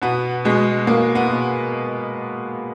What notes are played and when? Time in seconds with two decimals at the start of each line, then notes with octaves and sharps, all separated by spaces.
0.02 B2 B3
0.45 B2 G#3
0.87 B2 A#3
1.15 B3
1.30 B2